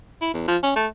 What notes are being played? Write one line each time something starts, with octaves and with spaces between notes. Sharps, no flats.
E4
E2
F3
C#4
A3